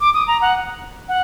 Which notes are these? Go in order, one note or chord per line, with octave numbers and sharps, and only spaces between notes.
D6
D#6
A#5
F#5
F#5